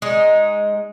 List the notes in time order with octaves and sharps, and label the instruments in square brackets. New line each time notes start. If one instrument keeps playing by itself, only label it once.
[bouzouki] G#3 D#4